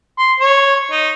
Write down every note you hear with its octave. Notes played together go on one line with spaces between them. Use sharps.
C6
C#5
D#4